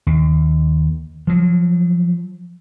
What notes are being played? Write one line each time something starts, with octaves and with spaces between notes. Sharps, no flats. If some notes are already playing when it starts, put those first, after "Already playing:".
D#2
F3 F#3